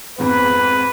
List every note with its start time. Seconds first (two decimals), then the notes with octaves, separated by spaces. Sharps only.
0.18 F2 G#2 B3 B4